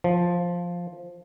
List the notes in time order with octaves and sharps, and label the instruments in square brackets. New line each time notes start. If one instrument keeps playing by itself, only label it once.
[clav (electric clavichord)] F3